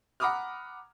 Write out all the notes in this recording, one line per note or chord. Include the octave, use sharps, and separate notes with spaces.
F#5 A#5 B5 D6 D#6 F6